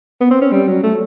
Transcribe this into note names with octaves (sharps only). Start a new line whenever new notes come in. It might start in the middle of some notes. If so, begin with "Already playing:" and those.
B3
C4
C#4
G3
F#3
A3